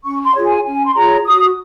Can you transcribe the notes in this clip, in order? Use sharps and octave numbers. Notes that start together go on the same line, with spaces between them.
C#4 C#6
C6
F4 G#4 C#5
G#5
C#4 G#5
C6
F4 G#4 C#5 A#5
F#4 D#6